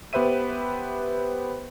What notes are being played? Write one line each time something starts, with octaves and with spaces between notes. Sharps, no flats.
B3 G4 B4 C5 E5 D#7